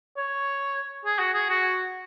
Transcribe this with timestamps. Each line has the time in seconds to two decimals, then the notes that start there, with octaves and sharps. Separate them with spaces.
0.17 C#5
1.05 G#4
1.19 F#4
1.33 G#4
1.49 F#4